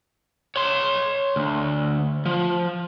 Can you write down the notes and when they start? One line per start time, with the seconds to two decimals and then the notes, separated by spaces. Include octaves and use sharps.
0.56 C#5 C6
1.36 D2
2.26 F3